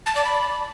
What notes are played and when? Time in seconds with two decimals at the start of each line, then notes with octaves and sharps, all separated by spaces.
0.06 A5
0.16 D5
0.25 B5